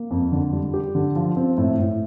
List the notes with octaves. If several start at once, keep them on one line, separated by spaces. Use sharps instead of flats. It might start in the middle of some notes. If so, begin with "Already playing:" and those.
Already playing: A#3
F2
D3
G3
G4
D3
F3
C4
A2
A2